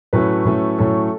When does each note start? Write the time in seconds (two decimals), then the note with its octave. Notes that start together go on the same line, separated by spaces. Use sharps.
0.13 A2 F#3 A3 C#4 B4
0.45 A2 F#3 A3 C#4
0.78 A2 F#3 A3 C#4 A4